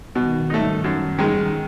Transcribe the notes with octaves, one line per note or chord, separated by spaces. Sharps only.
B2 D#3
A3 D#4
F#2
D#3 G#3